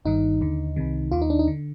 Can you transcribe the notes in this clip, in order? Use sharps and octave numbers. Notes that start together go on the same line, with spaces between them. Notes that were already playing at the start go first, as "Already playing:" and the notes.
G1 G2 D#3 D#4
D#2 D3
C2 C3 D#3
D#2 D#3 F4
D#4
D4
D#4
D3